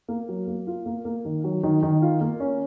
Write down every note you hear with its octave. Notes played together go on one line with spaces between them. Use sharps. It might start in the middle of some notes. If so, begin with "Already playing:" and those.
A#3
F#3
A#3
F4
A#3
A#3
D#3
F#3
D#3
D#3
F4
A#3
C#4